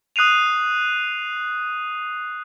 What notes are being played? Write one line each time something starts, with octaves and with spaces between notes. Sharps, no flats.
D#6 F#6 C7 D#7 F7